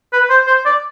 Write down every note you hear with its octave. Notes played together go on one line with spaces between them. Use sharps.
B4
C5
C5
D5